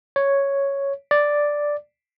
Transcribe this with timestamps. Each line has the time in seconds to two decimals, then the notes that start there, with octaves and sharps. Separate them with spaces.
0.16 C#5
1.11 D5